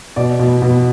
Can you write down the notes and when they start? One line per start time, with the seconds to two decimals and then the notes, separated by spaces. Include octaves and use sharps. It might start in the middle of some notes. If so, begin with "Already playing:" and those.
0.16 B2 D5
0.39 B2
0.62 B2